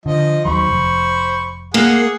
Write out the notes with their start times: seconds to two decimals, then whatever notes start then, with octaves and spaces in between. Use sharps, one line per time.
0.06 D3 F3 D#5
0.45 D#2 D#3 F#3 C5 B5 C#6
0.68 F1
1.74 A#3 G#4 F#5